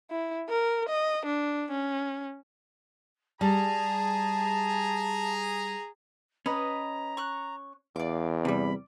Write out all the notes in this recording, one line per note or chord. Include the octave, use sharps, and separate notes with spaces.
E4
A#4
D#5
D4
C#4
G3 G#4 A5 A#5
C#4 B4 D#5 A#5
C#6 F#6
E2 D5 F5 D6
C3 G3 B5